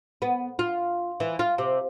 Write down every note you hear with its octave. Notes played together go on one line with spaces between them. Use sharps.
B3
F4
E3
F4
C3